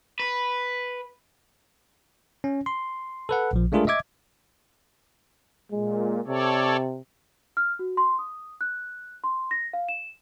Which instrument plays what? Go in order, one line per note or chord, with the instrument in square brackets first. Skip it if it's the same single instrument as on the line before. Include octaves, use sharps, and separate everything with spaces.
[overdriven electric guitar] B4
[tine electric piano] C#4
C6
A4 B4 F#5
A#1 F3
G#3 A3 D4 F4 G#4 A#4
D#5 E5 D6 G#6
[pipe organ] A#2 [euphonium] G#3
[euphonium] C3 [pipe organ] A4 C#5 D5
[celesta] F6
F#4
C6
D#6
F#6
C6
A#6
F5
E7